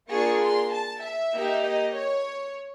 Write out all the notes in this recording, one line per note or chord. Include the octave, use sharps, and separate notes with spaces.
A#3 D4 F4 G#4 C#6
C6
A5
E5
A#3 D#4 G4
D#5
C#5